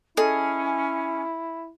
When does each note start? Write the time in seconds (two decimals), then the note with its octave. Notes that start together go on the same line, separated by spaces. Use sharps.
0.17 C#4 E4 G#4 A4 D#5